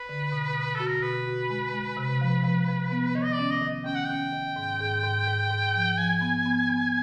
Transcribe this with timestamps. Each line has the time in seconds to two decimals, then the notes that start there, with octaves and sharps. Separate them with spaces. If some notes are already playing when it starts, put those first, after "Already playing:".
Already playing: B4
0.09 D3
0.32 B2
0.55 B2
0.75 F#4 A4
0.88 A#4
1.02 B2 B4
1.27 F#4
1.50 G#3
1.74 G#3
1.97 C3
2.21 F3
2.44 F3
2.68 F3
2.92 B3
3.15 D#3 C#5
3.24 D#5
3.33 D5
3.39 C#4
3.51 D#5
3.62 D#3
3.85 C#4 G5
3.95 F#5
4.05 G5
4.10 C#4
4.33 D#3
4.56 G#2
4.80 G#2
5.03 G#2
5.28 G#2
5.50 G#2
5.75 F3
5.98 F3 G#5
6.21 B3
6.45 B3
6.69 B3